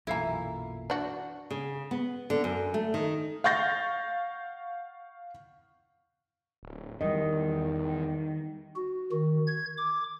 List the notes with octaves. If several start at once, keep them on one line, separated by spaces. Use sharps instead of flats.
B1 F#2 A#2 E3 E4 A4 F5 A#5
D4 F#4
C#3
B3
D3
F#2
A3
D#3
F5 F#5 C#6 G6 A6 A#6
D1
E2 D#3 G3 D#5
F#4
D#3
G#6
D6